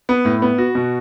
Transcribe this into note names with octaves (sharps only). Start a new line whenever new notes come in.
B3
A2
B3
F#4
B2